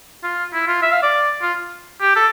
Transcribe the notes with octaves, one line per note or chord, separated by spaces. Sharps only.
F4
E4
F4
E5
F5
D5
F4
G4
A4